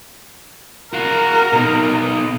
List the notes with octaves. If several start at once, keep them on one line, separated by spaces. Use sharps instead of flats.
F#4 A#4 F5
B2 D#4